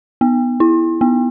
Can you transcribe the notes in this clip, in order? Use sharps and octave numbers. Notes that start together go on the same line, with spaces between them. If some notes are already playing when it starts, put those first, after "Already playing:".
B3
E4
B3